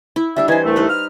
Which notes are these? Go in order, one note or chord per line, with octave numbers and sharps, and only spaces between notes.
E4
G3 D4 G4 E5
E3 D#4 E4 C5 G#5
C2 A3
D#4 B4 C5
F6